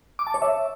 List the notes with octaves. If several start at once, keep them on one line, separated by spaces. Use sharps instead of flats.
D6
A5
C#5
E5